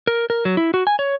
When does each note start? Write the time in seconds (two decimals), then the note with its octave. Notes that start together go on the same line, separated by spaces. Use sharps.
0.07 A#4
0.30 A#4
0.45 F#3
0.57 E4
0.74 F#4
0.87 G#5
0.99 C#5